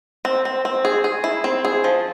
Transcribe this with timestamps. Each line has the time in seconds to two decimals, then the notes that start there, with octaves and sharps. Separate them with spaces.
0.25 C4
0.45 C4
0.65 C4
0.85 G#4
1.04 G#4
1.24 E4
1.44 C4
1.65 G#4
1.84 F3